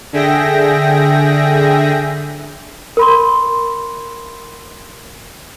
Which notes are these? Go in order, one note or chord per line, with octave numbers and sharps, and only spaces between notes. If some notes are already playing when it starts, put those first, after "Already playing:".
D3 G#4 E5 G5 A#6
A#4 B5 C6